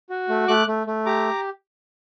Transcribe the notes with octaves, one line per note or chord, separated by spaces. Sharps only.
F#4
A3
A3 D6 F#6
A3
A3
G4 A#5 D6